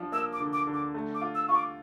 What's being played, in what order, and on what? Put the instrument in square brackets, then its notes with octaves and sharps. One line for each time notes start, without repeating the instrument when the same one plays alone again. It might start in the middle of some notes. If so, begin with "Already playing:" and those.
Already playing: [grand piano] F3 D4
[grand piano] A#3 [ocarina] E6
[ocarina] D6
[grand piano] D3
[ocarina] D6
[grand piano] D3
[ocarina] D6
[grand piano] A3
[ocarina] D6
[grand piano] F4
[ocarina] E6
[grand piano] F4 [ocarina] C#6
[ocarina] D6